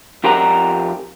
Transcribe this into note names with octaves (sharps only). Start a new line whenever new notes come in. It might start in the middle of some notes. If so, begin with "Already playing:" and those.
F2 G4 A#4 F#5 A#5